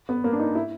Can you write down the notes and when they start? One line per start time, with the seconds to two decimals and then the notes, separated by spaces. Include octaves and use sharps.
0.09 B3
0.24 A#3
0.33 D4
0.39 D#4
0.55 E4